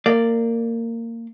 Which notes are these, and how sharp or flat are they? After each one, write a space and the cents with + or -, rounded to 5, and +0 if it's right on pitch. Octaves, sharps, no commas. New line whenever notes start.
A#3 -20 D5 +0